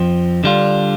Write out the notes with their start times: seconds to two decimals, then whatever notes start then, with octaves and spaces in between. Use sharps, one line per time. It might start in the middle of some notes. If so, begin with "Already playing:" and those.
Already playing: F2 F3 C4
0.44 D3 G3 D4 F4